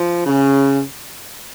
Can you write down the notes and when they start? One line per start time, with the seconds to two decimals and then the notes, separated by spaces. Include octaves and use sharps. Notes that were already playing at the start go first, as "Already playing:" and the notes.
Already playing: F3
0.26 C#3